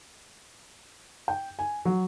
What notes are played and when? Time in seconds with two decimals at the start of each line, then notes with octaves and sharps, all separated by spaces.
1.28 G5
1.59 G#5
1.85 F#3